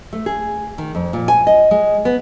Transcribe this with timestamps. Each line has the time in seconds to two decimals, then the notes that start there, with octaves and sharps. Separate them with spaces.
0.13 A3
0.26 G#4
0.78 D#3
0.95 F2
1.13 A#2
1.28 G#5
1.47 D#5
1.71 G#3
2.05 B3